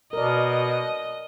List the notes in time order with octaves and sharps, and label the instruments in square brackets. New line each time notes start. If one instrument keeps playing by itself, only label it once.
[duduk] B2 [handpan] A#4 D5 [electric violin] D#5